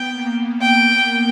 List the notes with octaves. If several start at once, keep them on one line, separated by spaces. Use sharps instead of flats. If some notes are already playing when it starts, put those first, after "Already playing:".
Already playing: B3 G5
A#3
G5